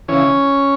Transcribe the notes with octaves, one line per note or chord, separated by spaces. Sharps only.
C#3 E3 C#4 C#5